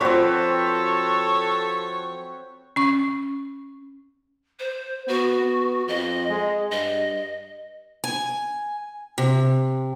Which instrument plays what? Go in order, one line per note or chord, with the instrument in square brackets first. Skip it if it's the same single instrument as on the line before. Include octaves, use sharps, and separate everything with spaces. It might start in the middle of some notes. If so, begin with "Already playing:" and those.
[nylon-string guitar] F3 D5 [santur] C4 F#4 B4 [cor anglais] A4 [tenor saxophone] C#5
[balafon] C#4 C#6
[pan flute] C5
[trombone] B3 [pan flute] F#4
[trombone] B3
[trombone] F2 [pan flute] D#5
[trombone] G#3
[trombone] G2 [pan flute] D#5
[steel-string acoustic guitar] G#5
C3